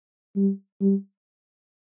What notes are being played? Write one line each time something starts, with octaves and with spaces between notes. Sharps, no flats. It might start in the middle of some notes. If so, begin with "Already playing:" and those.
G3
G3